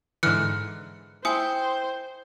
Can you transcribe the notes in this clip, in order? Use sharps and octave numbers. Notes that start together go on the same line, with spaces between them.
G#2 D3 E3 F6 F#6 C#7
E4 C5 G5 G#5 D#6